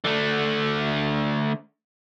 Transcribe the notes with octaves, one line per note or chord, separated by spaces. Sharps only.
D3 A3